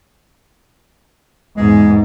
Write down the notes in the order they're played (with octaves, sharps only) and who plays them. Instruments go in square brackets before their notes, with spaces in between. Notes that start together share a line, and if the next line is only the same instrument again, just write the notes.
[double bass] E2 G#2 [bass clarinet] G#3